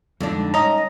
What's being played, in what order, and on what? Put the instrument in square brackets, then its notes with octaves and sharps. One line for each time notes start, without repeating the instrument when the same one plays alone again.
[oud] F2 D3 D4 [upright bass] G#3 D#4
[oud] C#4 [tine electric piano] D#5 A#5